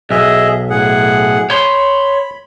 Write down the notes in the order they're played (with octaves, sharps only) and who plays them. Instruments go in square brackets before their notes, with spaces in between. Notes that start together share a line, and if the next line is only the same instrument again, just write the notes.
[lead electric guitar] B1 [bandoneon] G#4 D#5 E5
[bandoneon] A2 G#4 F#5
[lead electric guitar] C#5 C6 [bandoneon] B5